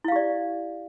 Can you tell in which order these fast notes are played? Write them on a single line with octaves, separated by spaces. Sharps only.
E4 F5 G4 D5